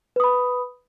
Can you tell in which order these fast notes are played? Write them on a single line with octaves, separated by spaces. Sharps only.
B4 D#6 B5